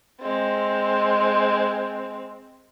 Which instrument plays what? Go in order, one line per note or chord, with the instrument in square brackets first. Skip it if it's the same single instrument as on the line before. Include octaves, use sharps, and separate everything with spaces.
[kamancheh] G#3 C4